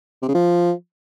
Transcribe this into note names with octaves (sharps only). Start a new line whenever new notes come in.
C3
C#3
F3